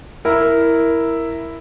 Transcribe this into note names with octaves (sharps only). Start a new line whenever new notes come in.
E4 A#4